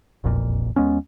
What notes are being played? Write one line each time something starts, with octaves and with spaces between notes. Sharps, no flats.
E1 A#1 F2 A#2
D#2 G#3 B3 C#4